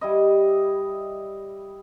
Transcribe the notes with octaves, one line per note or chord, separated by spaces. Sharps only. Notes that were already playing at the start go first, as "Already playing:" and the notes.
G3 E4 D#5